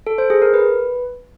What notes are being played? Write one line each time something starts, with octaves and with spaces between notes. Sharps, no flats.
A4
C5
G#4
A#4
B4